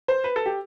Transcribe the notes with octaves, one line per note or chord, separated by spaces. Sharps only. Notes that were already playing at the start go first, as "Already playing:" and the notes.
C5
B4
A4
G4